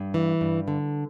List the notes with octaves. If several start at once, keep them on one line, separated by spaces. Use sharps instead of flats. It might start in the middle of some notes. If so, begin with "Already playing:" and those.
Already playing: G2
E3
G2
D3